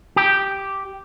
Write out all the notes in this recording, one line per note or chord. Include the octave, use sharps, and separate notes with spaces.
G4